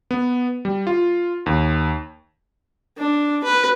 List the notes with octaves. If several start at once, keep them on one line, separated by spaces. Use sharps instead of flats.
B3
G3
F4
D#2
D4
B4